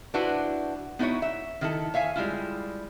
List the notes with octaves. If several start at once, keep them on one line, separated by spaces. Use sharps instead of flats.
D4 E4 F#4 B4 C5
B3 D#4 E4 F#4 C#5
E5
D#3 E4 A4
C#5 E5 F5 G#5
G3 G#3 E4 F4